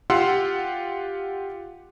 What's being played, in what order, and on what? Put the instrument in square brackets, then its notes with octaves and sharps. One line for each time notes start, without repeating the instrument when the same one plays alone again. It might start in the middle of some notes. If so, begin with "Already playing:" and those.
[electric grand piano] F4 G4 F5 F#5 C6 E6